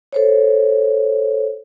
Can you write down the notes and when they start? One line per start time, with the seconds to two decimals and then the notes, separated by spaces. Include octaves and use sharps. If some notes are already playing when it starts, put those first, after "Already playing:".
0.13 A4 C5 C#5